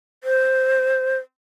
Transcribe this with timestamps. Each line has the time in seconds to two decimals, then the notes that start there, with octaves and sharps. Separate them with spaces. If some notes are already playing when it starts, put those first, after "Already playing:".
0.24 C5